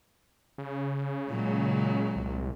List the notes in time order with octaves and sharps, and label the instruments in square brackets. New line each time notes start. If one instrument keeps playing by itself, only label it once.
[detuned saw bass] C#3
[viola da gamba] A#2 F#3 G#3
[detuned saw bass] C2